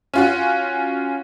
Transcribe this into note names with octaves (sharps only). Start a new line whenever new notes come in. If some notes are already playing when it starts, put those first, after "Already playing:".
C#4 F4 F#4